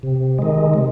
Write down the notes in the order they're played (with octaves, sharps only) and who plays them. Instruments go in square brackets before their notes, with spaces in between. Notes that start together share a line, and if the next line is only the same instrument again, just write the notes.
[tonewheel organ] C3
D#3 G#3
C3